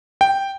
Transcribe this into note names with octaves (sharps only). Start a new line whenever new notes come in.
G5